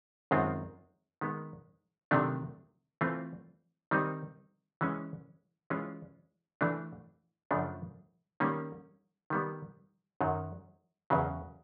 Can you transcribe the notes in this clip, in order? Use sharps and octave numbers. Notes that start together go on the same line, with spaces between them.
F#2 D#3 G#3 C4 F4
D#3 G#3 B3
C3 D#3 F#3 A3 D4
E3 A3 C4 F4
D#3 G3 C4 D#4
E3 G#3 C#4
E3 G#3 C#4 F4
E3 A3 D4
F#2 C#3 F3 A3 D4
D#3 G3 A#3 C#4
D#3 G3 B3
F#2 D#3 F#3
E2 C#3 F#3